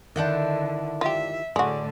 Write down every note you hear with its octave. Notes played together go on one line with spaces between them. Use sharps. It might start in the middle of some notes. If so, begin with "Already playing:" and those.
D3 D#3 D4 E4 F#5 G6
F4 G4 E5
A2 D3 G#3 F#4 D5